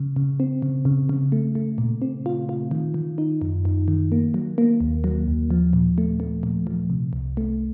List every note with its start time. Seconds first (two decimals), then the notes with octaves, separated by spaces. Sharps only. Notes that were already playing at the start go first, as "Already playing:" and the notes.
Already playing: C#3
0.16 C#3
0.40 C4
0.62 C#3
0.85 C#3
1.09 C#3
1.32 A3
1.55 A3
1.78 A#2
2.02 C4
2.26 F4
2.49 F4
2.71 D#3
2.94 D#3
3.18 D#4
3.42 F#2
3.65 F#2
3.88 D#3
4.12 A#3
4.34 F#3
4.58 A#3
4.81 D#2
5.04 F#3
5.28 D#2
5.51 F3
5.73 A#2
5.98 A3
6.20 A3
6.43 A#2
6.67 F3
6.90 C3
7.13 C2
7.37 A3